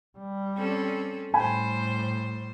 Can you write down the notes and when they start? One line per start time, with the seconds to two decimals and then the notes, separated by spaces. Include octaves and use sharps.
0.18 G3
0.57 C4 C#4 A4
1.34 A2 G3 C5 G5 G#5 B5